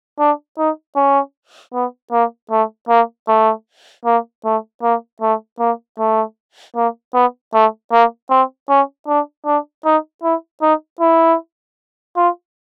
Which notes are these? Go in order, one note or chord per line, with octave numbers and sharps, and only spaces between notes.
D4
D#4
C#4
B3
A#3
A3
A#3
A3
A#3
A3
A#3
A3
A#3
A3
A#3
B3
A3
A#3
C4
C#4
D4
D4
D#4
E4
D#4
E4
F4